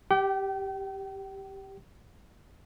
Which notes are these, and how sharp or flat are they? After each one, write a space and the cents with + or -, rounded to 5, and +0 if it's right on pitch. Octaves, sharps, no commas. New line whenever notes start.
G4 +0 G5 -35